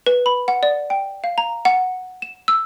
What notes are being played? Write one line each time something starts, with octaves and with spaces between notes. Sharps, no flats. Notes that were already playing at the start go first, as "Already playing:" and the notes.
B4
B5
F#5
D5
G5
F5
A#5
F#5
E7
E6